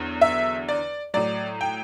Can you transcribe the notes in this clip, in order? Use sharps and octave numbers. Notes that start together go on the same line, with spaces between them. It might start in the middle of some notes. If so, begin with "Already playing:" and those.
Already playing: E2 D3 F#3
E5
D5
A2 F#3 D5
G5